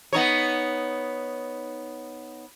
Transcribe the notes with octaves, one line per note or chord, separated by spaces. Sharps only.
B3 D#4 C#5